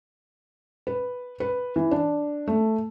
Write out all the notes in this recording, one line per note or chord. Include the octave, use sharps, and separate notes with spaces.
B4
B4
E3
D4
A3